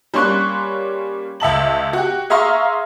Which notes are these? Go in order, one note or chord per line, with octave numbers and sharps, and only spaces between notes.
G3 A#3 C#4 C6 C#6 F#6
C#2 E5 A5 F#7
F#4 G4
G#4 E5 F5 A#5 C6 C#6